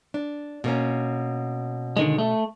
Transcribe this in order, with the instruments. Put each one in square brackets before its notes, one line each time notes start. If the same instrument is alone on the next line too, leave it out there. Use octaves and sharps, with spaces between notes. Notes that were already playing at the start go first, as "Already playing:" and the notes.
[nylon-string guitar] D4
B2 A#3 C#4
[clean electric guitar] D3 D#3 G#3
A3